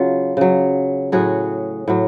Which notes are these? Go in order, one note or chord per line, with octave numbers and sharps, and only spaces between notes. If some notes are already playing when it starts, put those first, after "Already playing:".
Already playing: C#3 F#3 F4
C#3 F#3
A2 F#3 F#4 G#4
A2 F#3